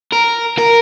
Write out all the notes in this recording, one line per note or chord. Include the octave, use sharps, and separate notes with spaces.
A#4
A#4